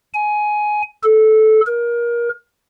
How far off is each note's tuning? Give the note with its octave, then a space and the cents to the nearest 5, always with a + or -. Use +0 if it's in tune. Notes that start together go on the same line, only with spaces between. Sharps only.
G#5 +15
A4 -15
A#4 +25